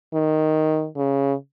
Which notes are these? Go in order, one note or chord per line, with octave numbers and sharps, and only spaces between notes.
D#3
C#3